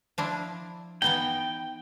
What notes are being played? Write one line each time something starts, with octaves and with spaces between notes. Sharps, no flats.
F3 D4 E4
E3 B3 D#4 G5